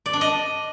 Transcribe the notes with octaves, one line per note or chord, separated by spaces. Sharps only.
D5
D4
D#5